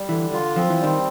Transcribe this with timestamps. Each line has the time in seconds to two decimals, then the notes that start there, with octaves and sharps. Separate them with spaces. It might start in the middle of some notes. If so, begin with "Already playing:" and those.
Already playing: G3
0.09 D3 E3
0.33 F4
0.56 F3 C4
0.70 E3
0.80 D#3 G3